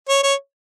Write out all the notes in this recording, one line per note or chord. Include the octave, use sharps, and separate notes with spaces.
C#5
C#5